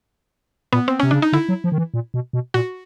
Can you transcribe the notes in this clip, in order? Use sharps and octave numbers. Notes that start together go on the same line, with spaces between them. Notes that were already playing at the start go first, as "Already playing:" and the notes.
A#2 B3
C4
C3 C#4
C#3 D4
D#4
D3 E4
F#3
F3
D#3
E3
A#2
B2
B2
A#2 F#4